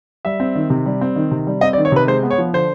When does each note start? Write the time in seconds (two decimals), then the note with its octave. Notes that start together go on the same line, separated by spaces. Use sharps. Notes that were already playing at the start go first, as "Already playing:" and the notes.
0.25 G3 E5
0.40 C4
0.55 D#3
0.70 C3
0.86 G3
1.01 C4
1.16 D#3
1.31 C3
1.47 G3
1.61 C4 D#5
1.73 D5
1.78 D#3
1.85 C#5
1.92 C3 B4
2.07 G#3 C5
2.23 B3
2.31 C#5
2.38 F3
2.53 D3 C5